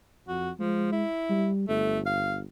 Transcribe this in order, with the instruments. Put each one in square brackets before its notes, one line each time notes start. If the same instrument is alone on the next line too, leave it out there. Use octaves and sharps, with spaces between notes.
[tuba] F2 [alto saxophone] F#4
[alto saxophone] F3 [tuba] G#3
[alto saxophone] E4
[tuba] G3
[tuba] G1 [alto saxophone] A3
[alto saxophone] F5